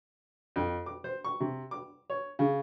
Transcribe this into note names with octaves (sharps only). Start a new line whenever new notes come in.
F2
D6
C5
C#6
C3
D6
C#5
C#3